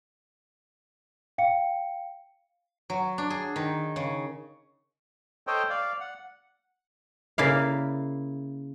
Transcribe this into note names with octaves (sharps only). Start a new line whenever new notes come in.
F5 G5 C#7
F#3
D4
G#4
D#3
C#3
A4 C5 C#5 D#5 G5
D5 F5
F#5
C#3 A#3 E4 D5 F5